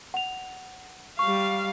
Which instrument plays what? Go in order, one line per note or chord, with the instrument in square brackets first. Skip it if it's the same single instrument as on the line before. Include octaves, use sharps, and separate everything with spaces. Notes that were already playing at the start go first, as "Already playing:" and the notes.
[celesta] F#5 F7
[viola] G3 F5 [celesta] C#6